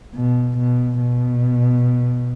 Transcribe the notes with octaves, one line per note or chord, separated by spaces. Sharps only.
B2
B2
B2